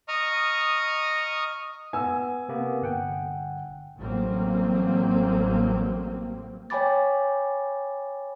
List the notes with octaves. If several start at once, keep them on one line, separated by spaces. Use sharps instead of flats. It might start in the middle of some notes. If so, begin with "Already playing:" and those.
D#5 A#5 C#6 D#6 F6
B3 G#5 E6
C3 A#3 B3
G1 F#5 G5
A1 F#3 G3 A#3 C4
C#5 G5 G#5 B5 D6 A6